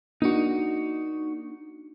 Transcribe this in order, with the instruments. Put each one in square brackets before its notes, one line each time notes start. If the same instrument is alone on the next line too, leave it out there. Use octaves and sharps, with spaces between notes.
[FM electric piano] A#3 D4 [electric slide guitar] D#4 F#4